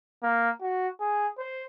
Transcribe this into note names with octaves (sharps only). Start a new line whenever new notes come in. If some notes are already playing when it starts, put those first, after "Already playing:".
A#3
F#4
G#4
C5